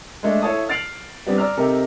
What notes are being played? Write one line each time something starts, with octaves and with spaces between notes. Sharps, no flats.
G#3 A3 D4
E4 A4 C#5 F5 A5 D#6
F6 A6 C7 D7 F7 F#7
G3 B3 C4 D4
D5 A#5 E6 F6
C3 D#4 G4 A4 A#4